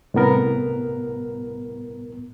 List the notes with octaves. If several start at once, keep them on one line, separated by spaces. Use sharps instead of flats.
C2 A2 B3 A#4